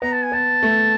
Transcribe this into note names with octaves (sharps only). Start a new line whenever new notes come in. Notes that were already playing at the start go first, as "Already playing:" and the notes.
B3 A#5
A5
G#5
B3 A5
A3